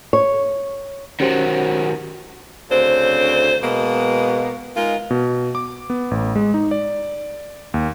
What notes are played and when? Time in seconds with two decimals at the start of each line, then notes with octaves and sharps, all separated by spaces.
0.13 C#5
1.20 D#3 F#3 C#4 G4 C5
2.71 D2 C#3 C4 D4 C5
3.62 B2 G#3 A#3 B3
4.77 G#3 D#4 F4 A#4
5.11 B2
5.55 D6
5.90 B3
6.11 A1
6.36 G#3
6.54 D#4
6.71 D5
7.74 D#2